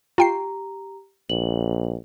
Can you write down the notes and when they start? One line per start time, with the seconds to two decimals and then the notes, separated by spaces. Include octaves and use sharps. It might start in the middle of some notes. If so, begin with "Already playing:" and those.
0.18 F4 G4 G5 A#5 C7
1.30 A#1 F#7